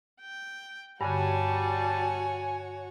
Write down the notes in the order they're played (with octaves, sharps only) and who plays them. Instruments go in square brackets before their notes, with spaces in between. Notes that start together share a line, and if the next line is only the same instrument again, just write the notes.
[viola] G5
[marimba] G2 D3 [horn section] G3 A5 [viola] F#4 C#5 [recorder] G#5